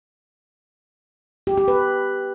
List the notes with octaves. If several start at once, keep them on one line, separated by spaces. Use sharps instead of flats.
G4
G4
B4